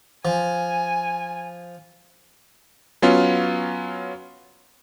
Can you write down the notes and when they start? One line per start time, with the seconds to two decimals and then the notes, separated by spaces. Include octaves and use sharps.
0.25 F3 G#5
3.02 F#3 B3 C#4 F4